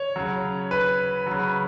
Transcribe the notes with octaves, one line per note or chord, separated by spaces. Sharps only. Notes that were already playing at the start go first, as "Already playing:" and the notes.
Already playing: C#5
C#3 F#3
B4
F#3
C#3